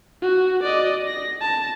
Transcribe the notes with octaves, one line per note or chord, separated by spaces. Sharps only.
F#4
D5 D#5
A#6
A5